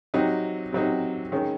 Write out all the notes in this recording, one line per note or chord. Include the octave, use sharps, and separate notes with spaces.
C3 F#3 C4 D#4
C3 F#3 C4 D#4
D#3 G#3 C#4